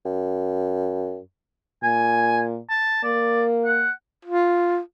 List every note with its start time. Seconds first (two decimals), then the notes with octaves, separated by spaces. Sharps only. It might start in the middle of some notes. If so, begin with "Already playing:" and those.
0.05 F#2
1.83 A#2 G#5
2.70 A5
3.04 A#3 D5
3.65 F#5
4.25 F4